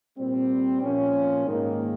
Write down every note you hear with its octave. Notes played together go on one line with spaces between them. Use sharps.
A#2 G3 C4
A#2 F3 A#3 C#4
G#2 D#3 A#3